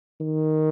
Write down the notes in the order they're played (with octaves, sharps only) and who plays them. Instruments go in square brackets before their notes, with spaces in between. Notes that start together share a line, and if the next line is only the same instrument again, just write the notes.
[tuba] D#3